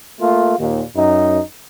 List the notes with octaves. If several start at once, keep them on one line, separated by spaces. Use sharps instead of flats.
A3 A#3 F4
D#2 A#2
F#2 D#4